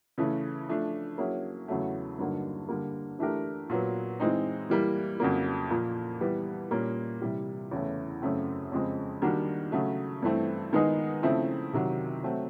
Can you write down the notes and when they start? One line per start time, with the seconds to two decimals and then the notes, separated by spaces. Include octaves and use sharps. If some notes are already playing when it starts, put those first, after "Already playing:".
0.18 C#3 E3 A3
0.68 F3 A3 D4
1.18 F#3 A#3 C#4 E4 G#4
1.68 E2 C#3 F#3 A3
2.19 G2 D3 F#3 A#3 D#4
2.69 D3 G3 A#3
3.19 E3 A3 D4 G4 A#4
3.70 A#2 F#3 B3
4.20 E3 G#3 C4 D#4
4.70 E3 G3 A#3
5.20 F2 C#3 F#3 A#3
5.70 A#2 F3 A#3
6.21 E3 G3 B3
6.71 A#2 G3 A#3 C#4
7.21 C3 E3 G3
7.71 E2 C#3 E3 A3 C#4
8.22 F#2 C#3 F#3 A3 C4
8.72 F2 C#3 F3 G#3 C4
9.22 D#3 G3 A#3 D4 F#4
9.72 C#3 F#3 A3
10.22 G2 E3 A3 C4
10.73 D#3 G#3 B3 D#4 G#4
11.23 C#3 F3 A3 C4 E4
11.73 C3 D#3 F#3
12.24 F#3 A3 C4